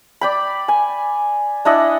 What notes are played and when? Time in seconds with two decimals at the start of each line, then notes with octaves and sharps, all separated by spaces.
0.21 D5 G5 B5
0.68 G#5
1.65 D4 E4 D#5 F#5